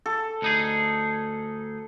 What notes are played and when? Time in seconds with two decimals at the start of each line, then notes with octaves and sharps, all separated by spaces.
0.06 A4
0.42 D2 D#4 G#4